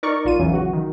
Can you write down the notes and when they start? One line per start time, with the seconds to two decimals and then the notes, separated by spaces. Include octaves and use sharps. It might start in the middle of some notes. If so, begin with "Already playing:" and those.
0.03 D#4 A#4 D5 C#6
0.25 A#1 F4 D#7
0.39 E2 C#3 E3 F#3
0.54 F#4
0.73 D#3